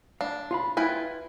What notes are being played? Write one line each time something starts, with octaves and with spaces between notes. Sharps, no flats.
D4 F5
F4 F5 B5
E4 F4 B4 G5 G#5